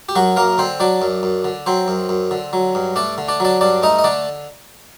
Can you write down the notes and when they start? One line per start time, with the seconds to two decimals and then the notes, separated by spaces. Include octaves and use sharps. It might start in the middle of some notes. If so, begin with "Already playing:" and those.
0.09 G4
0.15 F#2 F#3 F#4
0.36 F#2 A#3 A#4
0.58 D3 C4 C5
0.80 F#3 D4 D5
1.02 F#2
1.23 F#2
1.44 D3
1.66 F#3 C4 C5
1.88 F#2
2.09 F#2
2.31 D3
2.53 F#3
2.75 G2
2.96 A3 D4 D5
3.18 D3
3.28 D4 D5
3.40 F#3 D4 D5
3.61 G2 D4 D5
3.82 A3 D#4 D#5
3.99 D#5
4.04 D3 D4 D5